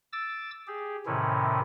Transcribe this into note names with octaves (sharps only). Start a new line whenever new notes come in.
D6 E6 A6
G4 G#4
A2 C3 D#3 E3 C#4 E4